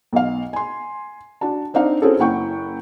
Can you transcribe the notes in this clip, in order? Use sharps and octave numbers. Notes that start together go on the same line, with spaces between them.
B1 F5
G#5 C6
D4 F#4 A5
C4 D4 D#4 F5
C4 C#4 E4 F#4 G#4 A4
F#1 E4 F#5 G5 C#6